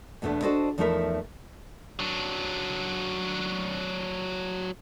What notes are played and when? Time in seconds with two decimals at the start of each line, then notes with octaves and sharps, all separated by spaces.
0.22 E2 B2 A3 B3 D4
0.43 D4 F#4 A4 C5 D5 D#5
0.78 E2 F3 A3 D#4 A#4 E5
1.99 F#3 D4